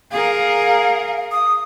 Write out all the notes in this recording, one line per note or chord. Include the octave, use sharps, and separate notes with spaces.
G#4 A#4 F5
D#6